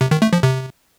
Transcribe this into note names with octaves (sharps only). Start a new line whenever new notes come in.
C3
D#3
A3
F3
C3